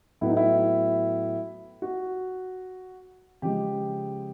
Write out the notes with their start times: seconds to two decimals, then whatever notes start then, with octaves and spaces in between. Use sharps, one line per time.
0.21 A2 F#3 B3 E4
0.29 D#4
0.37 E4
1.82 F#4
3.42 C#3 F3 G#3 G4